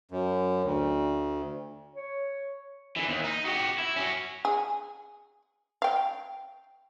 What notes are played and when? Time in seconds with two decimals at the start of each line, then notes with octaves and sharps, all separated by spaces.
0.11 F#2
0.64 D2
1.95 C#5
2.96 D3 E3
3.08 D#2
3.24 D#4
3.45 F#4 G4
3.78 E4
3.96 C#4 F#4
4.45 G#4
5.82 F5 G5